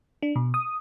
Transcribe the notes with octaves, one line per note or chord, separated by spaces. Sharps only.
D4
B2
D#6